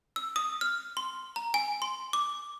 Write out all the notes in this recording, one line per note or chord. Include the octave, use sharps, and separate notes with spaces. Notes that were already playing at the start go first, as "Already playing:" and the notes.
E6
D#6
F6
C6
A#5
G#5
C6
D6